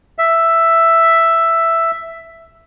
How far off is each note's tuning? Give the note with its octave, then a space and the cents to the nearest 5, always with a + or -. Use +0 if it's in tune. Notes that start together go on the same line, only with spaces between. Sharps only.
E5 +5